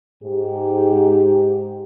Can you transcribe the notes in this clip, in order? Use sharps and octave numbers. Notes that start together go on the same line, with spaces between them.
G#2 G4